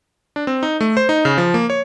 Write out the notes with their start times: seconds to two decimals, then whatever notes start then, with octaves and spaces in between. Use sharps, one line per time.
0.36 D4
0.47 C4
0.63 D#4
0.81 A3
0.97 C5
1.09 D#4
1.25 C#3
1.38 F3
1.54 A#3
1.70 C#5